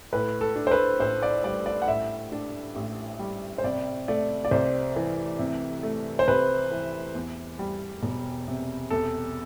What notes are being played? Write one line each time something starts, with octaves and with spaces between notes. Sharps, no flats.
A2 B4
A4
D4
C5
B4
A1 C5
D5
G3 D5
D5
F#5
A2 E5
D4
A1
G3
C5
C3 D5
A3 D5
D5
C2 C5
E3
C3
A3
C5
C2 B4
E3
E2
G3
E1
C3
E2 A4